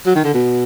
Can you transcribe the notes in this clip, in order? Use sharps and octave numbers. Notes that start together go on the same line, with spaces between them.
F#3
D#3
D3
B2